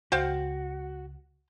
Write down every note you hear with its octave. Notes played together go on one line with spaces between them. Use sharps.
C#2 F#4 C5 F5 G5